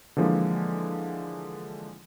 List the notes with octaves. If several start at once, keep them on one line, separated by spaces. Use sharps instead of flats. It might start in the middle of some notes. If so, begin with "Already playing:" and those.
D3 E3 F3 G#3 A#3